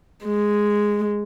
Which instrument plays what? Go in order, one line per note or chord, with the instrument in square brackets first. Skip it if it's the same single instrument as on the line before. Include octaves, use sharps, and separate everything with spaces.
[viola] G#3